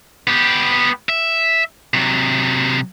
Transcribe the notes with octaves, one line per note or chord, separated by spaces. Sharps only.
B3 G4
E5
C3 F#3